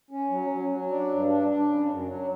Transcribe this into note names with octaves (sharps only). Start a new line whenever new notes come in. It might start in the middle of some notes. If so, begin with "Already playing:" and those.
C#4
F#3
F#3
F#3
D4
G2
D4
D4
C#3
F#2
F#3